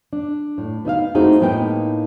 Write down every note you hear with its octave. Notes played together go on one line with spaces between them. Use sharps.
D4
A2
B3 D#4 E5 F5
A3 C4 D#4 E4 F#4 G#4
A2 A#3 B3 D#4 G5 G#5